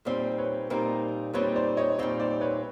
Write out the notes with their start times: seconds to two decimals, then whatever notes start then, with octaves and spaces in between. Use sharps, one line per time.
0.05 A#2 G3 C4 D#4 C5 D5
0.38 B4 C#5
0.70 A#2 G3 C4 D#4 A#4 C5
1.33 A#2 G3 C4 D#4 B4 C#5
1.56 C5 D5
1.77 C#5 D#5
1.98 A#2 G3 C4 D#4 C5 D5
2.20 C5 D5
2.41 B4 C#5